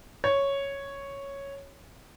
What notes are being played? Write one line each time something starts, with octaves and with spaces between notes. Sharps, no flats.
C#5